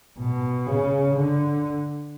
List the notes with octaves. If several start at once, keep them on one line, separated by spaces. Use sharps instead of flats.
B2
C#3
D3